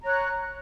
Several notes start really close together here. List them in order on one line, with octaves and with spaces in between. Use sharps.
A#5 C#5 F#6